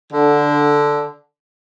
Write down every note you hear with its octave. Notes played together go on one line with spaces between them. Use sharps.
D3